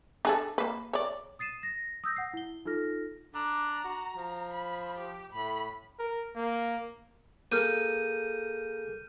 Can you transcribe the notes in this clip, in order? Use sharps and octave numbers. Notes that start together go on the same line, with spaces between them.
D4 G#4 A4
A#3 B4
C#5 D5
D#6 A6 C7 D#7 E7
A#6
D#6 E6 G6 A#6
F#5 C7
E4 G7
D#4 F4 A4 F6 A#6
D4 A#5
F#4
F3
B5
G4
A2 B5
A#4
A#3
A#3 G#4 A4 F6 G6 D#7